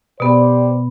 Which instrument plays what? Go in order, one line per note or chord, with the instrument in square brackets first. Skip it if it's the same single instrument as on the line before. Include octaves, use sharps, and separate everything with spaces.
[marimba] B2 B3 [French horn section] G4 C5 D5